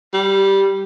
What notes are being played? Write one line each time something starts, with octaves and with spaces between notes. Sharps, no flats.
G3